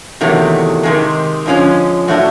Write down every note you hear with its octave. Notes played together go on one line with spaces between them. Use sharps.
E2 C3 D#3 F#3 A3
C3 D#3 G#3
D3 F3 G#3 C#4
A2 F#3 A3 D4 F#4